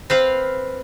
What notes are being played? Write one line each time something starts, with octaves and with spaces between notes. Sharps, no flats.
C4 B4 F5